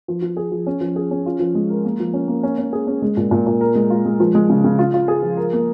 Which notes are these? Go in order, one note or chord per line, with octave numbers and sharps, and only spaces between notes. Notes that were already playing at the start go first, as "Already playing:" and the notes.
F3
F3
G#4
F3
C#4
F3
G#4
C#4
F4
F3
G#3
A#4
A#3
F3
C#4
A#3
C#4
C#4
G#4
C#4
G#3
A#2
A#2
A#2
A#4
G#3
F4
G#3
F3
G#3
C#3
C#3
F4
F4
G#4
F3
A#4
A#3